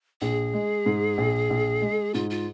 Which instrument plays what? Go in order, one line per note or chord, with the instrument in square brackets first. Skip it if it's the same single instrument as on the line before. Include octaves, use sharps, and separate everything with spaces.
[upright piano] A#1 [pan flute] G#4
[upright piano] G#3
G#2
A#1
A#1
G#3
[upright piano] G#2 [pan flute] F4
[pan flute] F4